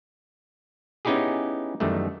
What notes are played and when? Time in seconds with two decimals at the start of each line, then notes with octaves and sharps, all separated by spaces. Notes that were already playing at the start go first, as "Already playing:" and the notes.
1.05 B3 C#4 D#4 E4 G4 G#4
1.80 F#2 D#3 E3 G3 A3